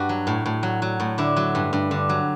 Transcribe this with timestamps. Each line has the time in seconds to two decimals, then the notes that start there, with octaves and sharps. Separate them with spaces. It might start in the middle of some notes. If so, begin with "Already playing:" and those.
Already playing: G2 F#4
0.09 F#3
0.27 A2
0.46 A2
0.63 F#3
0.82 F#3
1.00 A2
1.18 D3 E4
1.36 F#3
1.55 G2
1.73 G2
1.91 D3
2.09 F#3